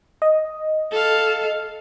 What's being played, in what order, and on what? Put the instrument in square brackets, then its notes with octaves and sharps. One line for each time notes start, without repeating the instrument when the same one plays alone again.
[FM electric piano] D#5
[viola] A4 F5